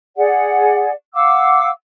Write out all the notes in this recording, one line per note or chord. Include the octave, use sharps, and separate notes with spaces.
G#4 D5 F#5
F5 F#5 D6 E6